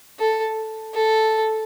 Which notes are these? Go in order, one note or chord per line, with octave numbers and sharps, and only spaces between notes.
A4
A4